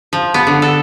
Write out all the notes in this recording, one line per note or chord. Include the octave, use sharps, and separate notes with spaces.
F3
B3
D3
A4